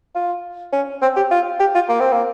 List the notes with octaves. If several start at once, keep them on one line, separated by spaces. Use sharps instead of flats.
F4
C#4
C4
G4
F4
G4
F4
A#3
C4
A#3